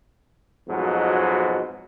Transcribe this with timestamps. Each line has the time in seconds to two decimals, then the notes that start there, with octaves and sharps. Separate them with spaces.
0.68 F2 G#2 B2 F#3